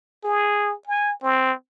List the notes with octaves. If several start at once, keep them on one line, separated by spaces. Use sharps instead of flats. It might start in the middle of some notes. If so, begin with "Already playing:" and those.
G#4
G#5
C4